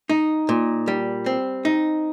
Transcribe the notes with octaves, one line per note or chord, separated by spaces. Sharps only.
D#4
A#2
G3
C4
D#4